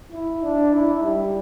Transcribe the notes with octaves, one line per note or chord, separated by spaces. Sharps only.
E4
D4
E4
G3